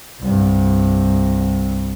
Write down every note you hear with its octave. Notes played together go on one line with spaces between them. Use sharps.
C2 G2